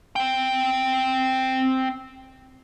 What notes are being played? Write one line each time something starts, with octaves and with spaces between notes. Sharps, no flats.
C4 G5